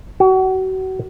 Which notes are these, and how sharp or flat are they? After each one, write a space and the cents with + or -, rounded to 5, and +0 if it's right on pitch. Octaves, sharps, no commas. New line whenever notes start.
F#4 +30